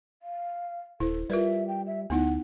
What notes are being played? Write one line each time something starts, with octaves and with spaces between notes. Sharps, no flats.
F5
D#1 E4 A4 C5
G3 F4 A#4 B4 E5
G5
E5
D2 B3 D#4 E4 F#5